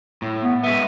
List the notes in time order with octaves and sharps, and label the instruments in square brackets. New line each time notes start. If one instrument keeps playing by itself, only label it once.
[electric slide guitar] A2
[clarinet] B3
[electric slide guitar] G#3 B3 [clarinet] E5